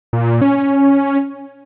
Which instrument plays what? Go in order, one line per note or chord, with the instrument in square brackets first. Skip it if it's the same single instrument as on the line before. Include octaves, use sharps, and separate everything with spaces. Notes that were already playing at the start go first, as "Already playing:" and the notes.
[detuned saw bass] A#2
C#4